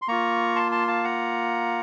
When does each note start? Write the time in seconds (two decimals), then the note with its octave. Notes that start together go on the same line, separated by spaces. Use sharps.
0.02 C6
0.08 A#3 F4 A#5 C#6
0.56 A5 C6
0.72 A5 C6
0.88 F5 A5
1.04 F#5 A#5